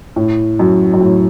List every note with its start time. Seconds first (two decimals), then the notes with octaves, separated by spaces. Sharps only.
0.16 A2
0.59 F#2
0.93 F#2
1.01 A2